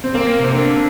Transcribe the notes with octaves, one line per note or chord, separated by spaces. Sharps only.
C4
A#3 C4
A#3
C3 C4
D3 A#3